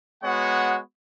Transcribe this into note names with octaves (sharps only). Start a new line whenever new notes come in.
G#3 B3 F#4 C#5 F#5